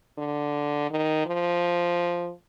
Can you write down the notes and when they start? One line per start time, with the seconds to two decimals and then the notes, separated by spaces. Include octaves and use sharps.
0.18 D3
0.91 D#3
1.26 F3